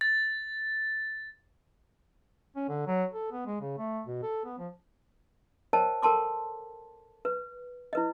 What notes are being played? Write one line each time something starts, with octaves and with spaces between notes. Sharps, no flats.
A6
C#4
D3
F#3
A4
B3
G#3
C#3
A3
B2
A4
B3
F3
A#4 C5 C#5 D#5 G5 A5
A4 A#4 G5 A5 C6 D6
B4
E4 B4 D#5